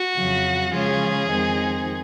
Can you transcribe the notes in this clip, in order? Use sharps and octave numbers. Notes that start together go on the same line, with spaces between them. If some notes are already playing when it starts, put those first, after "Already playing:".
Already playing: F#4
F2 C#3 F#3
C#3 F3 G#3 C#4 F4 G#4
F2 D#3 G#3 C4 D#4